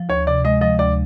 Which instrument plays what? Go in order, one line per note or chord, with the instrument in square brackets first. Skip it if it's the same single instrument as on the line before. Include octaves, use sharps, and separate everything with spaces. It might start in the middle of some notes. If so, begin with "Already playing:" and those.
Already playing: [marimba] F3
[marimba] D2 [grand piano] C#5
[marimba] C3 [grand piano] D5
[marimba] G#3 [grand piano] D#5
[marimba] F3 [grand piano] D#5
[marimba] D2 [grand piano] D5